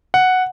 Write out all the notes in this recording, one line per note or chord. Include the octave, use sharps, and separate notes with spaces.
F#5